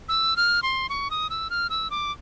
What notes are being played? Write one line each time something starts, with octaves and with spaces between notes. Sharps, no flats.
E6
F6
C6
C#6
D#6
E6
F6
E6
D6